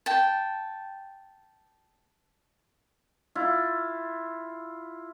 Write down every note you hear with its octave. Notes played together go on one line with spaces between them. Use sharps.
G5 A5
E4 F4